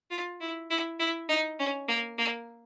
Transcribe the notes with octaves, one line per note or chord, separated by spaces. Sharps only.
F4
E4
E4
E4
D#4
C#4
A#3
A#3